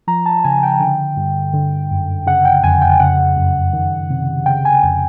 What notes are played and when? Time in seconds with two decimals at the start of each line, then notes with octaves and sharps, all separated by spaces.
0.07 F3 A#5
0.26 A5
0.44 C#3 G#5
0.63 G5
0.80 D3
1.17 G2
1.53 D3
1.91 F#2
2.26 C#3 F#5
2.45 G5
2.63 F2 G#5
2.81 G5
3.00 C#3 F#5
3.37 F#2
3.73 D#3
4.10 C3
4.46 C#3 G5
4.65 G#5
4.83 F2 G#5